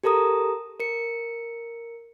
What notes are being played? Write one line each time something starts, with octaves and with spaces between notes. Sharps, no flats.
G4 A4 A#4 A#5 D#6
A#4 C#7